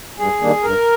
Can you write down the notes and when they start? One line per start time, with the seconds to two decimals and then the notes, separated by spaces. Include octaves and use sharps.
0.18 G2 G#4
0.41 D#3 G3 A#3 D4
0.63 G2 A#4